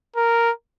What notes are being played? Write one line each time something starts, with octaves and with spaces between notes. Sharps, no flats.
A#4